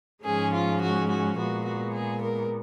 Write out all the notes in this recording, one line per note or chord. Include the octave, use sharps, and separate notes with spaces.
G#2 F3 G#3 C#4 G#4
F4
F#4
F#4
A#2 G#3 B3 F#4
F#4
G#4
A#4